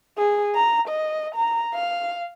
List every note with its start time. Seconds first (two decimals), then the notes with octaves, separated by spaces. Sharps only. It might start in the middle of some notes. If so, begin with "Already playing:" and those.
0.18 G#4
0.55 A#5
0.88 D#5
1.35 A#5
1.74 F5